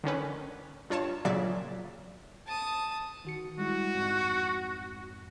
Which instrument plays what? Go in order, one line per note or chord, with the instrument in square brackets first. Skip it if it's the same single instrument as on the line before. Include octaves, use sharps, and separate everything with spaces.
[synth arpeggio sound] D3 D#3 C#4 B4
G2 F4 C#5 A5 E7
A#2 C#3 F#3 D5 E5 B6
[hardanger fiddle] A5 D#6
[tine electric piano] D#3 F#4 C#7
[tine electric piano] G3 G#3 E4 [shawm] F#4
[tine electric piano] F2 G#2